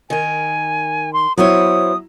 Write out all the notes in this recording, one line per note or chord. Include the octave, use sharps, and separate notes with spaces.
D#3 A#4 G#5
C6
F#3 B3 E4 C5 C#5 D#6